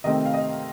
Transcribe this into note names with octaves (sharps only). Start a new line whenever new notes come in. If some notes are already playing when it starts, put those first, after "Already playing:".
C3 D#3 A3 C4 D#5
F5
D#5